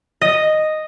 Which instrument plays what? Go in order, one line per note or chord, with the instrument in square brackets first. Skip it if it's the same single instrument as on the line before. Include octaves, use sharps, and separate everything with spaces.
[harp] D#5